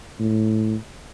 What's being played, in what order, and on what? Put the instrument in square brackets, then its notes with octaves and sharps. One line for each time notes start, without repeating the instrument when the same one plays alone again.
[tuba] A2